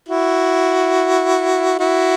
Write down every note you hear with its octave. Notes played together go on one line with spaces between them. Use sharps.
E4 F#4
E4 F#4